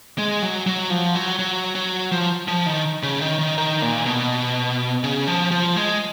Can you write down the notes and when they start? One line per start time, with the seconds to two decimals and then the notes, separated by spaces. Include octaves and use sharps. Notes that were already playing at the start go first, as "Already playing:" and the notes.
0.18 G#3
0.42 F#3
0.66 F#3
0.90 F3
1.15 F#3
1.39 F#3
1.75 F#3
2.12 F3
2.48 F3
2.66 D#3
3.03 C#3
3.21 D#3
3.39 D#3
3.58 D#3
3.82 A#2
4.06 B2
5.04 C#3
5.27 F3
5.51 F3
5.76 G#3